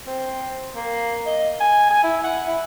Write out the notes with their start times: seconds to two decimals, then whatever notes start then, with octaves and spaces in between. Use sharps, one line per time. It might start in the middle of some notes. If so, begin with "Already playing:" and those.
0.07 C4
0.76 A#3
1.26 D#5
1.60 G#5
1.91 G#5
2.03 E4
2.24 F#5
2.47 E4